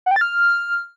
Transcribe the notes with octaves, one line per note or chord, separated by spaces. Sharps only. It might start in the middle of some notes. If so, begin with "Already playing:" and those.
F#5
G5
A6
F6